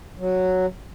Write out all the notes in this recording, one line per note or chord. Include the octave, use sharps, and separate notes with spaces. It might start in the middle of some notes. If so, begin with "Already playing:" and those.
F#3